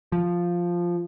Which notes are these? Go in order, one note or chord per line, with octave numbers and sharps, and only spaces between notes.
F3